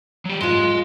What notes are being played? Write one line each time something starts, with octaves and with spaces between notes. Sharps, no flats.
F#3 G4
G#2 F4 D#5 C6